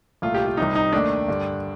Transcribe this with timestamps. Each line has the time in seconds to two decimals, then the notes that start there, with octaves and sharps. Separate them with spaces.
0.22 C2 A#2 A3 F4
0.34 G4
0.46 F4
0.57 C2 C3 G3 D#4
0.75 D#4
0.92 D#2 D#3 A3 D4
1.28 G2 D3 G3